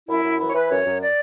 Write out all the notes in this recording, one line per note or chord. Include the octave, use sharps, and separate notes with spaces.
F#2 E4
F#2
E3 E4
C#5
E3 B4
F#2 C#5
F#2
D5